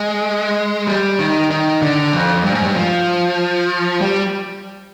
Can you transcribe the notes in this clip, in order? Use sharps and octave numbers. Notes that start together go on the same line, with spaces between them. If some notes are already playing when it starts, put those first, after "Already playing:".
Already playing: G#3
G3
D#3
D#3
D3
F2
G2
G#2
G2
F3
G3